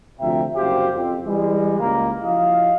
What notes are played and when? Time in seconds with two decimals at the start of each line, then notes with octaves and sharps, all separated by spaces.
0.20 D2 C3 F3 E5 G5 A#5
0.56 F#1 C2 F#4 G4 C5 F5
0.95 F2 C4
1.25 E3 G3 G#3
1.78 C#2 A#3
2.23 F3 E4 F#4 D#5 F5